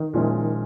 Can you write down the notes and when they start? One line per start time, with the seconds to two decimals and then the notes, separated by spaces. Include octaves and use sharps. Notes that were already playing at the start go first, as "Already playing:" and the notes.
Already playing: D#3
0.14 A#2 F3 G#3 C#4 E4